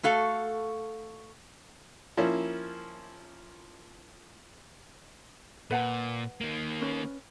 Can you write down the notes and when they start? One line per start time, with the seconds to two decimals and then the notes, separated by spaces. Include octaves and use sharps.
0.03 A3 F#4 A4 F5
2.17 F3 A#3 C#4 E4
5.71 A#2 B4 F#5 A5
6.41 D#3 A#3
6.81 C#4 B4